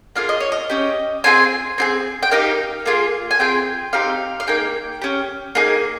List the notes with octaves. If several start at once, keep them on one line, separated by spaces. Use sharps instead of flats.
A#3 F4 G#4 F5
D#5
C#5
D#5
C#4 G4
C4 F4 G#4 G#5
C4 F4 G#4
G5
A#3 D#4 G4 F5
A#3 F4 G#4
G#5
C4 F4 G#4 G5
C4 D#4 G4 F5
F5
A#3 D#4 G#4 G5
C#4 G4
A#3 D#4 G#4